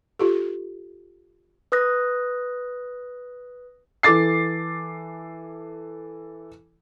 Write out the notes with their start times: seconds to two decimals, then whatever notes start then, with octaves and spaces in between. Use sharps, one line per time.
0.19 F4 G4 A4
1.72 B4 D#6 F#6 A#6
4.03 E3 A4 D6 A6 C7